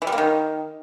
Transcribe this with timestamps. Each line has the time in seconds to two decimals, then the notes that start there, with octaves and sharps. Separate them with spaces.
0.02 E3
0.07 G3
0.12 A#3
0.18 D#3